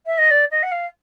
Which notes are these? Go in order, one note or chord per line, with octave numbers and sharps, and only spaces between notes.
E5
D#5
D5
D#5
F#5
F5